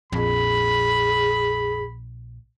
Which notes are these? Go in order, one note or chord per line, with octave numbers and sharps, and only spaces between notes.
A#1 F2 G#4 B5